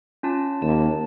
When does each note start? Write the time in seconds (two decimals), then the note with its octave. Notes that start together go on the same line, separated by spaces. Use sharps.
0.23 C#4 F4 A5
0.62 D#2 A5